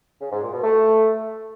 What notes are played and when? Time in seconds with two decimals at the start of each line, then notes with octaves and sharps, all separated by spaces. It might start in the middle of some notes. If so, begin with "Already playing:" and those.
0.21 C#3
0.32 G#2
0.42 A#2
0.53 B2
0.64 A3